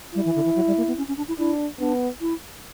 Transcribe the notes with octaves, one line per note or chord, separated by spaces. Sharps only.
G3 E4
E3
D3
E3
F#3
G3
A#3
B3
C#4
C#4
D4
E4
D4 E4
B3 D4
E4